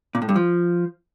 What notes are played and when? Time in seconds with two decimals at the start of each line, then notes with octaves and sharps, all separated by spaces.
0.15 A#2
0.22 A2
0.29 G2
0.36 F3